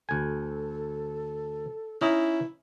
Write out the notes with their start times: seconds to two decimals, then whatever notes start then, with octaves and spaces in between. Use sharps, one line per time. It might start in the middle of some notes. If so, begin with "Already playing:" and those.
0.09 D2 A4 G#5
2.01 C#4 D#4 E4 D#5